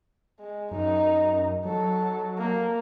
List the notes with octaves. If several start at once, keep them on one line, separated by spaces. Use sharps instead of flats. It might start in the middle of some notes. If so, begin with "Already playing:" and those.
G#3
F#2 D#4
F#3 A4
A#3